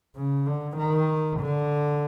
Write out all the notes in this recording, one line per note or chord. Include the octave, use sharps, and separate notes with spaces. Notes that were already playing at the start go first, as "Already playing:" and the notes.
C#3
D3
D#3
D3